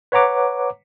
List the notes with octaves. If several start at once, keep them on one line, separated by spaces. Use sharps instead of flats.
B4 C#5 F#5 A#5 D6